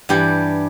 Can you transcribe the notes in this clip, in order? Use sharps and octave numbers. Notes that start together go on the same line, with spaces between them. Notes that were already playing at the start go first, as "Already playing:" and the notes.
G2 E3 G3 G4